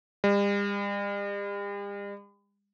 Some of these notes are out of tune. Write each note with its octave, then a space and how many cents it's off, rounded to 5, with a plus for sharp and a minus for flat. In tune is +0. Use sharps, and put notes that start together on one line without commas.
G3 +45